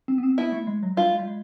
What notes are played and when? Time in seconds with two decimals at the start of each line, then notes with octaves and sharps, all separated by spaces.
0.08 C4
0.18 B3
0.23 C4
0.38 B3 E4
0.52 A3
0.67 G#3
0.83 F#3
0.97 G3 F4
1.12 G#3
1.19 G3
1.27 G#3